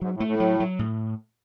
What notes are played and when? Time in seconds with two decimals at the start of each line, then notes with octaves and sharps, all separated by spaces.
0.01 G#2 F#3
0.14 A2
0.20 A3
0.27 A2
0.40 F#3
0.60 F#3
0.79 A2